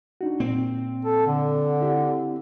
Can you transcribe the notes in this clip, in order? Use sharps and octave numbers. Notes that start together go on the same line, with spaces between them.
D4 D#4 F#4
A#2 C4
A4
D3
E4 G4